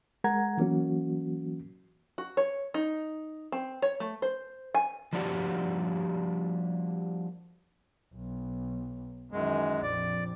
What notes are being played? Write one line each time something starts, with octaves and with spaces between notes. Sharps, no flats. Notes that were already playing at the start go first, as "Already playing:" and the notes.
G#3 A#4 F#5 A#5 G#6
E3 F#3 A#3 C#4 F#4
F#4
C#5
D#4
C4
C#5
A3
C5
G#5
F3 G3 A#3 D4 F#4 G4
B1
F#2 D#3 E3 G#3
A#1 F2 D5